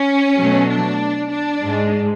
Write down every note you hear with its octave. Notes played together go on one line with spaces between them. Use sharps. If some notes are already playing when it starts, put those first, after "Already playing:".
Already playing: C#4
B2 F#3 A3
D4
D4
G#2 G#3